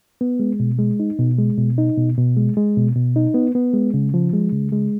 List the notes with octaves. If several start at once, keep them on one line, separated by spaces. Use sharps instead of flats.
B3
G#3
B2
G#3
D#4
B2
G#3
B2
D#4
B2
B2
G#3
G#3
B2
B2
D#4
B3
B3
G#3
C#3
F3
G#3
C#3
G#3